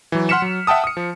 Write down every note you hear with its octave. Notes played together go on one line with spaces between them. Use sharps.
E3 F#3
F#5 C6 F6 B6 C#7 E7
F#3
E5 F#5 G5 A5 D#6
D#6 C#7
F3